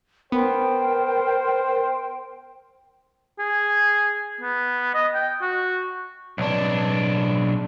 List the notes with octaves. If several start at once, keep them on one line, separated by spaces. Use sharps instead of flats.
B3 A#4 C5 G5
G#4
B3
D#5
G5
F#4
B1 D4